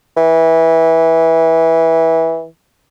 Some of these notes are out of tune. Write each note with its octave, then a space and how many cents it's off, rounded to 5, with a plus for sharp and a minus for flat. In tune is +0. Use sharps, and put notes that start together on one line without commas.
E3 -15